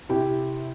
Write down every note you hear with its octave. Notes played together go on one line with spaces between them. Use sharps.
C3 E4 G4